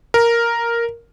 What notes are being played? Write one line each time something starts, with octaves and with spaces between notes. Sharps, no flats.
A#4